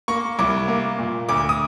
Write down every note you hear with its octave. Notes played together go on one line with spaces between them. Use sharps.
A#3 C#6
C2 D6
A#3
A#2
D2 D6
D#6